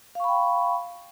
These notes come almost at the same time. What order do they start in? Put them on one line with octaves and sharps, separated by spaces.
F5 C#6 B5 G5